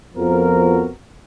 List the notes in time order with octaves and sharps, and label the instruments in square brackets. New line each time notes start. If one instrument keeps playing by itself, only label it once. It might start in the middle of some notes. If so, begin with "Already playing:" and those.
[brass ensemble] F2 F3 B3 F#4 A#4